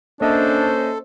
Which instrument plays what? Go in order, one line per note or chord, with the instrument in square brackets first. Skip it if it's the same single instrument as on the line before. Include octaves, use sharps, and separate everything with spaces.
[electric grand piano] A#3 D#5 E5 [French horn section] C#4 C5 [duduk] D4 [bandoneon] A4